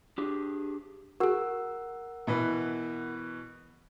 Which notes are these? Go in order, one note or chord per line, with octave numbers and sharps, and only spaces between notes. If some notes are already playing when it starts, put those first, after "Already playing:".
D4 G4 G#4
F#4 G#4 A#4 F#5 E6
B2 E3 B4